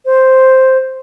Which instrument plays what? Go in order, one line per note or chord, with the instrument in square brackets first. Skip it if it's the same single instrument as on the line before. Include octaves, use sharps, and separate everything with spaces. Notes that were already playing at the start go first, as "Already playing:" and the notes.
[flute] C5